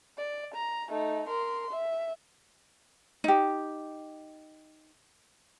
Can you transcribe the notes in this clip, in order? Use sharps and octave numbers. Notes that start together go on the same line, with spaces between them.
D5
A#5
A3 D#4
A#4 C6
E5
D#4 G4